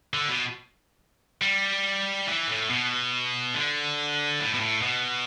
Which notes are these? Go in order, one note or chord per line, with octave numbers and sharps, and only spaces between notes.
D3
B2
G3
E3
A2
B2
D3
A2
B2
A2
B2